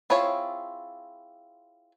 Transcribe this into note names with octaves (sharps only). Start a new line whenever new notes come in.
C4 E4 F4 G#4 C#5